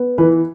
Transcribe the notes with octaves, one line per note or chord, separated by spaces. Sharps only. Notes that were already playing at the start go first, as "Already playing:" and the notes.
Already playing: B3
E3 B4